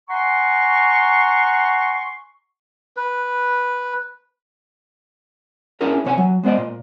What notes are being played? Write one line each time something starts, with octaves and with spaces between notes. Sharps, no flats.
F#5 G#5 A#5 C6 C#6
B4
C#4 D4 E4 G#4 A#4 C#5
D#2 C3 C#5 F#5 G#5
F#3
G#3 B3 C5 D5 D#5
A#2